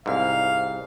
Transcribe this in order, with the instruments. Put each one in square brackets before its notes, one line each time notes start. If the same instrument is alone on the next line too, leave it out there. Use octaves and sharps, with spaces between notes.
[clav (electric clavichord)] C2 G#2 [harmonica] F5